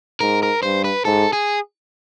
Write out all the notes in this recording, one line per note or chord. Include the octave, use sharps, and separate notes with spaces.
G#2 A#4
A#4
G2 C5
B4
G#2 A4
G#4